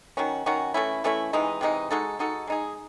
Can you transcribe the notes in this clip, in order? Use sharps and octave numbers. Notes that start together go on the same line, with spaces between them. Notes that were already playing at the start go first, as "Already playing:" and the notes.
D#3 F#3 C#4 F#4
D#3 F#3 C#4 F#4
E3 A3 C#4 E4
E3 A3 C#4 E4
C3 E3 G#3 D#4
C3 E3 G#3 D#4
G#3 D#4 F#4 A4
G#3 D#4 F#4 A4
G#3 D#4 G#4